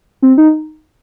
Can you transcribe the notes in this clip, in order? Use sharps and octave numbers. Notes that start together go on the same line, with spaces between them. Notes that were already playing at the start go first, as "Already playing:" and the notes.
C4
D#4